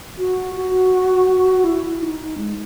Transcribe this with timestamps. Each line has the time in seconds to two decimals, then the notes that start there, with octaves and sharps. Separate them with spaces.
0.18 F#4
0.55 F#4
1.64 E4
2.01 D#4
2.38 G#3